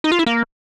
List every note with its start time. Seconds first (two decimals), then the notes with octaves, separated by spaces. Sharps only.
0.04 D#4
0.12 F4
0.19 E4
0.26 A#3